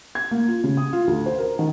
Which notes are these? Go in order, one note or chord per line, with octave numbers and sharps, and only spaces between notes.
G#6
A#3
F4
C#3
D#6
F4
D2
C5
A#4
D#3